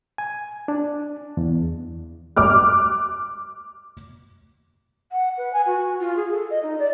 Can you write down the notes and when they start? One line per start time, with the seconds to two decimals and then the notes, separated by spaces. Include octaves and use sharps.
0.18 G#5
0.68 D4
1.37 E2
2.36 D6 F6 F#6
5.11 F#5
5.37 B4
5.53 G#5
5.66 F#4
6.00 F4
6.16 G#4
6.31 A4
6.50 D#5
6.63 D#4
6.79 D5